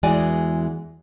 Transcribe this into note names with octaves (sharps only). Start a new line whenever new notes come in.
E2 E3 G#3 F#4 D5 G#5